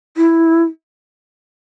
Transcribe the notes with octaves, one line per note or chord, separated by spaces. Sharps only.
E4